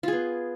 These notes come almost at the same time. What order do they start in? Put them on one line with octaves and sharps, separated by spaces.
F4 G#4 B3